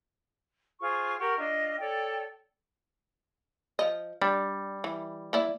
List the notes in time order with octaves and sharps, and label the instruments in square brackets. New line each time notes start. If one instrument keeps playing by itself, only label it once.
[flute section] F4 G#4 C5 C#6
G4 A#4 F#5 C#6
D4 F4 D#5
A4 C#5 D5 G5
[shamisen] F3 D#5
[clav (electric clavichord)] G3 [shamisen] D4
[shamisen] E3
A#3 E4 D5